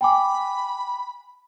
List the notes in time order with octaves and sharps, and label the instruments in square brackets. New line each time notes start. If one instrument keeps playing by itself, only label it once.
[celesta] G5 G#5 D6 [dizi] B5